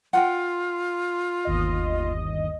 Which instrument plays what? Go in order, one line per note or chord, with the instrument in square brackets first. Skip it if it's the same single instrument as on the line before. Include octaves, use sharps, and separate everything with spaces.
[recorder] F4 [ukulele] F#5 G5
[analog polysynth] G1 D#2 D#5